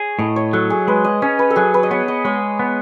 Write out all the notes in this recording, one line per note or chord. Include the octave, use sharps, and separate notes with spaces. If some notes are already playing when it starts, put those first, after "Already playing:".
Already playing: G#4 C#5
A2 D#5
C#5
F#3 A4
G#4
G#3 B4
D#5
C#4 C#5
B4
A4
F#3 G#4
B4
D#5
B3 C#5
D#5
G#3 C#5
B3